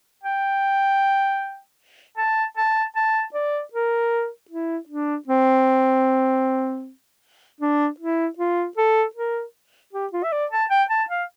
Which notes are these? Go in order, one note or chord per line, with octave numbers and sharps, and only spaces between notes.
G5
A5
A5
A5
D5
A#4
E4
D4
C4
D4
E4
F4
A4
A#4
G4
F4
E5
D5
A5
G5
A5
F5